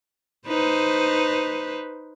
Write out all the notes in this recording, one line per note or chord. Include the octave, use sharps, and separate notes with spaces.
D#4 B4 C5